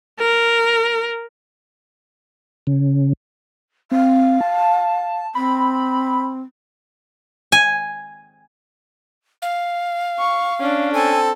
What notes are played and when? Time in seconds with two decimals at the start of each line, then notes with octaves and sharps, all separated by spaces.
0.19 A#4
2.67 C#3
3.91 C4 F5
4.41 A5
5.35 C4 B5
7.52 G#5
9.42 F5
10.19 C#6
10.60 C#4 D4
10.94 C4 A4 G#5